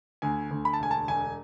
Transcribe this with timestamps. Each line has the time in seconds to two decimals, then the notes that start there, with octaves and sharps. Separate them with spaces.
0.22 D2 G#5
0.51 D2
0.65 B5
0.73 A5
0.80 E1 G#5
0.91 A5
1.08 E1 G#5